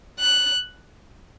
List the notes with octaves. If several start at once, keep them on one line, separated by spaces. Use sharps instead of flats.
F#6